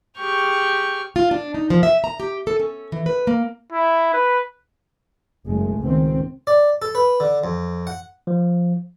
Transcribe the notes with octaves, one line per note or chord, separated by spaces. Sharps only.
G4 G#4 G5 C#6 F6
F4
D4
D#4
F3
E5
A#5
G4
A4
C#4
E3
B4
A#3
E4
B4
F#1 G#3 A3
C#2 D#3 C4
D5
A4
B4
D3
F2
F#5
F3